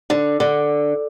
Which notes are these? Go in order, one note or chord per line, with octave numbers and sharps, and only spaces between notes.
D3
D3